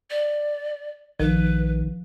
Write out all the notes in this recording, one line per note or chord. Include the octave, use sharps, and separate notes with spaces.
D5
A#1 D#3 F3 B4